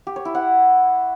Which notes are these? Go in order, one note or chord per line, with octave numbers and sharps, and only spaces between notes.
G4
C#5
E4
F#5